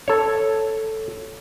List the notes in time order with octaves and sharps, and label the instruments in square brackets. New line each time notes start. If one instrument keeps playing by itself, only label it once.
[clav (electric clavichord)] A4 C#5